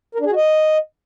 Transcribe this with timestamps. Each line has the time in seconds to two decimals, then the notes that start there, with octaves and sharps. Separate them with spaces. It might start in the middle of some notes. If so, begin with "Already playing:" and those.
0.15 A#4
0.20 D4
0.25 G#4
0.31 F#4
0.36 D#5